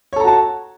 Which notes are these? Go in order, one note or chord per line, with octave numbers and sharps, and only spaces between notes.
F#4 A4 C#5 A5 A#5